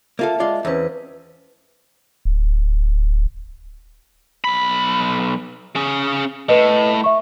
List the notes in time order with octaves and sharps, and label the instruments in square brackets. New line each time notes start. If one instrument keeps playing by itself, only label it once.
[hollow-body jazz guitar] A#3 F4 A4 [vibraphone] E5 A5
[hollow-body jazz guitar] G#3 F4 D5
[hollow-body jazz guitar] E2 C4 C#4 [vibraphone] B4 C5
[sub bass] D1
[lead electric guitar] B1 B5
C#4 G#4
[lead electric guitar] A2 [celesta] B4 D#5
[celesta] E5 C#6